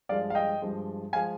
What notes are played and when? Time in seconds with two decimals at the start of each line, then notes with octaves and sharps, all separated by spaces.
0.09 G2 F3 G#3 D5 F5
0.30 F5
0.35 D#5 G5
0.62 G2 F3 G#3
1.13 F3 G#3 F5 G#5